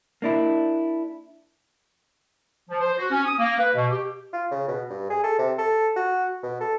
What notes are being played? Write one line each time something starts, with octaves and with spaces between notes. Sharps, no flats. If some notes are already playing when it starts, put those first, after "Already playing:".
A#3 D4 E4
F3
C5
F#4
C#4
D#6
A#3
B4
B2
G4
F4
C#3
B2
G2
G#4
A4
C3
A4
F#4
B2
A4